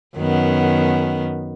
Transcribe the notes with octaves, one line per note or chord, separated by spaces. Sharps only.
F#2 D#3 B3